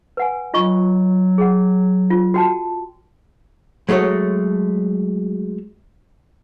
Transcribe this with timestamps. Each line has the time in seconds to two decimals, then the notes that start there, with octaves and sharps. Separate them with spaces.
0.17 B4 F#5 G#5
0.54 F#3 F4 D#5 C#6
1.38 G#4 F#5
2.10 F4
2.34 F#4 G5 A5
3.89 F#3 G#3 A3 A4 C#5